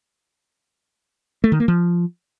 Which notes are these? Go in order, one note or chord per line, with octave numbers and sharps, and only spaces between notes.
A3
D#3
A#3
F3